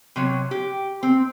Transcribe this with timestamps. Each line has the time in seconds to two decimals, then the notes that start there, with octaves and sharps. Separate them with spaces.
0.16 C3 F#3 C#5
0.51 G4
1.03 C4